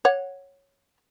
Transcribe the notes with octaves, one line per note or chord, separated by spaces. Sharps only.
C#5 F#5